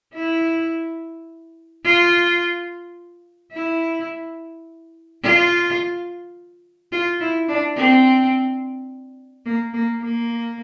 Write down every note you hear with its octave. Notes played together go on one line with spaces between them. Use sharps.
E4
F4
E4
F4
F4
E4
D4
C4
A#3
A#3
A#3